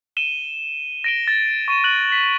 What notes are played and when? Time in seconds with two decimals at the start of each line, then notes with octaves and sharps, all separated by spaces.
0.17 D#7 E7 G7
1.04 A#6 D7 G7
1.27 A6
1.68 C#6 D#7 E7
1.84 F#6 F#7
2.12 B6